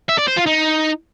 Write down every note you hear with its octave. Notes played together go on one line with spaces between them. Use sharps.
E5
D5
C5
F4
D#4